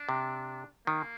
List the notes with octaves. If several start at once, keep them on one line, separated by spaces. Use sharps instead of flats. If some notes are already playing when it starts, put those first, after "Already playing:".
Already playing: D4
C3
D#3 A#3